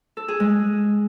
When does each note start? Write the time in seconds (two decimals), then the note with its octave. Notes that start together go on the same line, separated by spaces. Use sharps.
0.17 A4
0.28 G#4
0.40 G#3